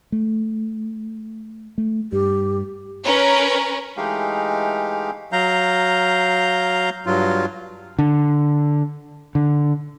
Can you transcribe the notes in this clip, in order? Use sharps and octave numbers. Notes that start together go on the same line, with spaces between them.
A3
A3
G2 G4
C#4 A#4 B4 C#5
E3 G#3 A3 D#4 G4 F5
F#3 F5 A#5 G6
G2 F#3 F4
D3
D3